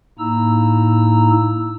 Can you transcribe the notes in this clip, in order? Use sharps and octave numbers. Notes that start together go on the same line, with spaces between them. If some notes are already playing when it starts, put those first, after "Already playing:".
A2 A#3 D#4 E4 A#5 E6